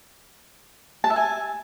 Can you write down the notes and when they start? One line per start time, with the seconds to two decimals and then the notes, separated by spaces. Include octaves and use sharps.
1.04 A5
1.10 E5
1.16 G#5